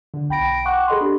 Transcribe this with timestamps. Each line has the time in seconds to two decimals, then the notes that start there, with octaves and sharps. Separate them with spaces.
0.14 D3
0.29 B1 G5 B5 A#6 D7
0.65 F#5 G5 C#6 D6 F#6
0.88 G#4 A4 D#5 B5 C6
1.01 D4 G4